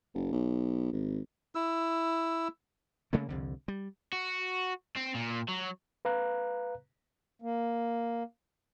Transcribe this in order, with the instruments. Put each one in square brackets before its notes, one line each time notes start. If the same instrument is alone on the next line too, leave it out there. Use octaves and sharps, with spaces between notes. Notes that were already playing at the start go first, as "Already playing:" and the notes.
[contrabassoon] F#1
B1
G#1
[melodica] E4 E6
[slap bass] C#3 A3 A#3
C2 F2 D3
G3
[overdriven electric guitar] F#4
C4
A#2
F#3
[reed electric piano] B4 F5 A#5 F#6
[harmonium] A#3